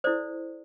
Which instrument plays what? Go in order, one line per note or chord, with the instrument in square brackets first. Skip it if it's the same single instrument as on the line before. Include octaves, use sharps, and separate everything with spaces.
[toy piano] E4 A4 C5 D5